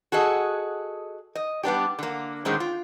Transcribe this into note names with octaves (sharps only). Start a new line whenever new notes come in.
F#4 G#4 A4 D#5
D#5
G3 B3 D4 G4
D3 A#3
A#2 D3 D#3 G#3 C4 C#4
F4